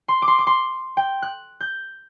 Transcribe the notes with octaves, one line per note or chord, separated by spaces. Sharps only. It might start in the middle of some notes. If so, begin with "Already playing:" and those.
C6
D6
C6
D6
C6
G5
F#6
G6